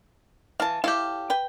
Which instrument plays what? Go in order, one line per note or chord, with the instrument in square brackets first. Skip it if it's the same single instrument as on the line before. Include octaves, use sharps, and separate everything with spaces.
[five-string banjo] E3 [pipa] F5 A5
[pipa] E4 C#5 [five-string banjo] G4 A4 F5
[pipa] B4 G5